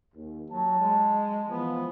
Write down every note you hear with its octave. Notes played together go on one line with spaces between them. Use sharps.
D#2
F#3 A5
G#3
E3 F3 B3